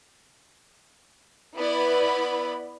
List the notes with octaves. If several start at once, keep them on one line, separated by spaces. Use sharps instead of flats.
B3 E4 B4 D5 B5